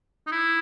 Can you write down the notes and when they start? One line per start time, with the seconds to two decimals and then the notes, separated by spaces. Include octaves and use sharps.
0.27 D#4
0.32 E4